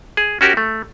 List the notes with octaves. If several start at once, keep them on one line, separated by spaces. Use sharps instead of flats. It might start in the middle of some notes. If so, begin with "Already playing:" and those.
G#4
C#4 F#4 G4 A#4
A3